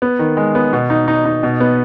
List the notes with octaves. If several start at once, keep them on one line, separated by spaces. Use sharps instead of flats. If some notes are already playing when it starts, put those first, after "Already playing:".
B3
D#3
G#3
B3
B2
D#4
D#4
D#4
B2
B3